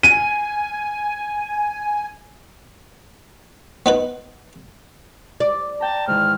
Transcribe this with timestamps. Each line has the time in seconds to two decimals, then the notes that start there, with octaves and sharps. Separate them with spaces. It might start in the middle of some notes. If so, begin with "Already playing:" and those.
0.03 G#5 D#7
3.86 B3 D#4 B4
5.40 D5
5.80 G5 A5 A#5
6.08 G#2 D#3 E3 F6